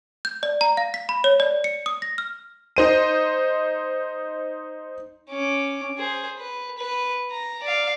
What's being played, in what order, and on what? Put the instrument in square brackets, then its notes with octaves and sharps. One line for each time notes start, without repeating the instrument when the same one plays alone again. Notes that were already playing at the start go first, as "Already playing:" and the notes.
[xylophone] G6
D5
A#5
F5
B6
B5
C#5
D5
C#7
D#6
A#6
F6
[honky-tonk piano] D#4 C5 D#7
[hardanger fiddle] C#4 D6
G#4 C5
B4
B4
A#5
D5 F5